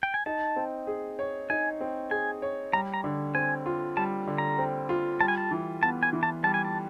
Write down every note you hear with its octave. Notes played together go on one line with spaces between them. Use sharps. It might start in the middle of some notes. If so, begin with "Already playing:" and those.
G5
G#5
D#4 A5
C4
G#4
C#5
D#4 G#5
C4
G#4 G#5
C#5
G3 A#5
A#5
D3
C4 G#5
F4
G3 A5
D3
A#5
C4
F4
G3 A5
G#5
A5
E3
B3 A5
G#5
E3
A5
G3 A5
G#5
A5